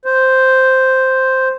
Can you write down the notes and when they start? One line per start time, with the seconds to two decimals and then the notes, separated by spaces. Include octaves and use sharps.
0.05 C5